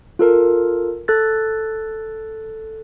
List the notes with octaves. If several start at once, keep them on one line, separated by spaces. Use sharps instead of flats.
F4 A4 A#4
A4 F#6 A6